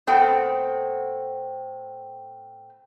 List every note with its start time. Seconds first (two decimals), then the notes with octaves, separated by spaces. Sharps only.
0.07 A2 B3 C4 A4 G5